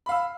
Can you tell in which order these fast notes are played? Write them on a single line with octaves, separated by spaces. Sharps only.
B5 F5 E6